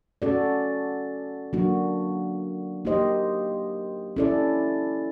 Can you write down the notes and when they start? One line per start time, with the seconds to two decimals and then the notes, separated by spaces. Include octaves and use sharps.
0.22 C#4 F#4 A4 D5
1.53 F#3 A#3 D4 F#4
2.85 A#3 D#4 G4 C5 D#5
4.16 C#4 E4 A4 D5